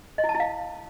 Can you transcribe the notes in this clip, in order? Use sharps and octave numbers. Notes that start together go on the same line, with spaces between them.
D#5
E4
A5
E4
F5